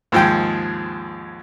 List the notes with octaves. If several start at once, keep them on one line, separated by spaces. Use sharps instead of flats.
D#2 G#2 F3 G#3 G5